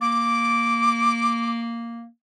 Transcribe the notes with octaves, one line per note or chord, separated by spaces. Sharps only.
A#3 D6